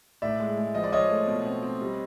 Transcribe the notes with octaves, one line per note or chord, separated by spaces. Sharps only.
A2 D5 E5
G#3
G#3
F3 D#5
D5
F3 C#5 D#5
A3
B2
C4
C4
G3